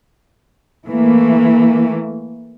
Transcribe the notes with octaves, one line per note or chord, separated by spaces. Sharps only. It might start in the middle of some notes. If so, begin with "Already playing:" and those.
E3 A3 A#3